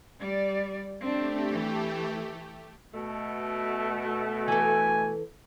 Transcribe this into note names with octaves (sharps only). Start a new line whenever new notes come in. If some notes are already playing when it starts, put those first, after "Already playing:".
G3 D5
A3 C4 D4 G4
E3
B2 A3
E3 A4 G#5